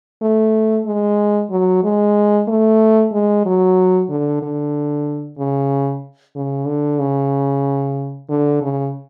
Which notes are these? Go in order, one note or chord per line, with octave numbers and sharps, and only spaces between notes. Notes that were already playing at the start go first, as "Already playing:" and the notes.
A3
G#3
F#3
G#3
A3
G#3
F#3
D3
D3
C#3
C#3
D3
C#3
D3
C#3